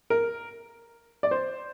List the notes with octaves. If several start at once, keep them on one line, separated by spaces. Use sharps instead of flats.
A#4
D5
C5